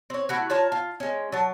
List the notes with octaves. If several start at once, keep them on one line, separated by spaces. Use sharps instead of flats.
C4 C#5
A3 E4 F#4
F4 C#5 A5 A#5
F4
G#3 C#4
F#3 A5